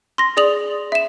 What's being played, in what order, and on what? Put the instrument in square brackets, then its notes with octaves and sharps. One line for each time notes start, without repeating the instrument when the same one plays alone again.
[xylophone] C6 A#6
G#4 D5 D#6 F7 F#7
E5 E7